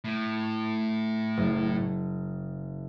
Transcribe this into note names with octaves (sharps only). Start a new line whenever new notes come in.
A2
F#1